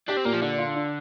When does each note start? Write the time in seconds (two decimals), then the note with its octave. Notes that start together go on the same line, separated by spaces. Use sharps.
0.08 D4 G4
0.17 C4
0.25 A#2 A#3
0.34 F3
0.42 D3 D4
0.58 F4
0.75 D4